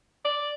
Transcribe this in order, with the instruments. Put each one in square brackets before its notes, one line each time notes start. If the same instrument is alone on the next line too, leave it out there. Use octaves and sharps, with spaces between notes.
[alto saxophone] D5